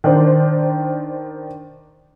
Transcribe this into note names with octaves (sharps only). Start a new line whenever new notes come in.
D#3 D4 C5